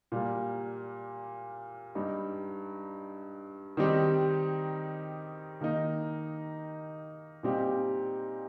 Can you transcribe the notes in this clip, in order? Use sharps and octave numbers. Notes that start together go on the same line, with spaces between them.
A#2 G3 A#3
G2 G3 D#4
D#3 G3 C4 D#4 G4
D#3 A#3 D#4
A#2 G3 C4 D#4 G4